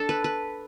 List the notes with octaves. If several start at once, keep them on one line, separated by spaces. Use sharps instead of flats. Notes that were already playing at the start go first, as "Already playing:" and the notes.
Already playing: D4 A4
B4
B4